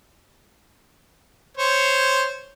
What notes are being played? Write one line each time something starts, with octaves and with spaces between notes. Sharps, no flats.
C5 C#5